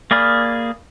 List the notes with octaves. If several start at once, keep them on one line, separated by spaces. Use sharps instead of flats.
A#3 G#4 D5 B5 F6